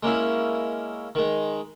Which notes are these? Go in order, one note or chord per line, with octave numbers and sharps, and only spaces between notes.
G#3 A#3 C#4 E4
D#3 G#3